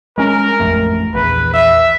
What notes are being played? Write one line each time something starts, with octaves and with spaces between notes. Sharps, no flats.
G#3 C#4 A#4
A1 F2 A3
A#1 E2 B4
E5